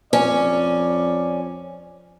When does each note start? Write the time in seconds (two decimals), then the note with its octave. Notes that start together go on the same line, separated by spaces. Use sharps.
0.13 F2 C#4 D5